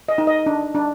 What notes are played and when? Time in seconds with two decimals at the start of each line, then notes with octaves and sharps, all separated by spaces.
0.09 D#5
0.18 D#4
0.27 D#5
0.46 D4
0.75 D4